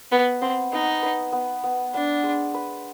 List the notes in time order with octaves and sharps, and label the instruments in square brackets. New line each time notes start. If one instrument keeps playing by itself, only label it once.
[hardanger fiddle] B3 [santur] B4
[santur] B3 [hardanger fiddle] C4
[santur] B3 [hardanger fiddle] D#4
[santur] B4
B3
B3
[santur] B3 [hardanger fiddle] D4
[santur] G#3
B4